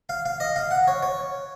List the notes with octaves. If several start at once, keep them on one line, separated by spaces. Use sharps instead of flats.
F5
F5
D#5
F5
F#5
C#5
C#5